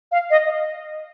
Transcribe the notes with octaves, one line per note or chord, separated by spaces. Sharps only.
F5
D#5